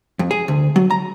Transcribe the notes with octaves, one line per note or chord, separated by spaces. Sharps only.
F2
G#4
D2
F#3
A#5